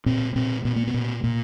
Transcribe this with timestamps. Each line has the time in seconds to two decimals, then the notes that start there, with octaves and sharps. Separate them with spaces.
0.06 A#2 C4
0.36 A#2 C4
0.65 A#2 B3
0.76 A#3
0.87 B3
0.94 A#2
1.24 A#2 A#3